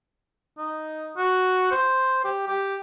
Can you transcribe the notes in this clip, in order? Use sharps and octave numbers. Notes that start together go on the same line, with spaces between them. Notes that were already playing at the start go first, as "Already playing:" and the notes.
D#4
F#4
C5
G4
G4